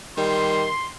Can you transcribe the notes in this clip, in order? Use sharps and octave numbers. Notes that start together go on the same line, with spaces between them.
D#3 G3 C6